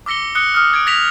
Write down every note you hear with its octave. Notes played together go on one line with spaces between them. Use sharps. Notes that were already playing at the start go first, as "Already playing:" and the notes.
D6 E6 A#6 C#7 G7
D#6 F#6 C#7 G7
D#6 F6
D#6 G#6 D7
G#6 A#6 B6 F7